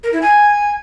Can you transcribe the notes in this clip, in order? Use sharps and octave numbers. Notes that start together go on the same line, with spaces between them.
A#4
E4
G#5